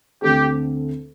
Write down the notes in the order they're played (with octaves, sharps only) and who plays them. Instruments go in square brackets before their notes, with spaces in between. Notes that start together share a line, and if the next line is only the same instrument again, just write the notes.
[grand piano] D2 D3 A3 C4 A4 [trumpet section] G4